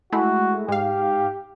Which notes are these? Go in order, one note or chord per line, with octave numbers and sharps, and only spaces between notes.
G#3 A3 E4 F#4
G#2 G4 F5